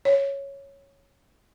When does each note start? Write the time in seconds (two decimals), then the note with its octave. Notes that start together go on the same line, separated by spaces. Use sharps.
0.05 C#5